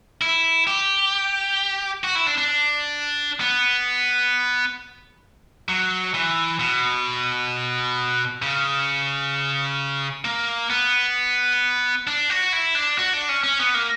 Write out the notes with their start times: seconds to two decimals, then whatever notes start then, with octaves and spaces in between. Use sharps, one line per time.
0.21 E4
0.67 G4
2.04 F#4
2.15 E4
2.27 D4
2.38 D4
3.40 B3
5.69 F#3
6.14 E3
6.59 B2
8.42 C#3
10.25 A#3
10.70 B3
12.07 D4
12.30 F#4
12.53 E4
12.75 D4
12.98 F#4
13.13 D4
13.29 C#4
13.44 C#4
13.59 B3
13.74 A#3